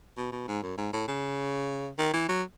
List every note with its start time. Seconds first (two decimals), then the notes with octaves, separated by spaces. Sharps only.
0.17 B2
0.32 B2
0.48 G#2
0.63 F#2
0.78 G#2
0.93 A2
1.08 C#3
1.99 D#3
2.14 E3
2.29 F#3